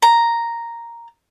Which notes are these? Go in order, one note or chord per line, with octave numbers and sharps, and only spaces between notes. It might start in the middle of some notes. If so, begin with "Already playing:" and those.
A#5